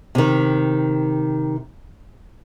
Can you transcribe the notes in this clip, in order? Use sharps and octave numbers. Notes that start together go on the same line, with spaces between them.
C3 D#3